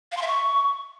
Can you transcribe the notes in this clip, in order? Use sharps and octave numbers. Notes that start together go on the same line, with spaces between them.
F5
C6
E5
C#6